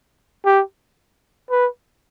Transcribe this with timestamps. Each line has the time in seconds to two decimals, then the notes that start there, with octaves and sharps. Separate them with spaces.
0.45 G4
1.51 B4